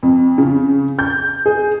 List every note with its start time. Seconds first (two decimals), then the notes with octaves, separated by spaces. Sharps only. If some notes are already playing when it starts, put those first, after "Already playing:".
0.03 F2
0.38 C#3
0.99 G6
1.46 G#4